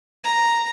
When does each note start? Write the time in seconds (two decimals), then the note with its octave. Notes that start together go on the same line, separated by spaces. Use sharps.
0.24 A#5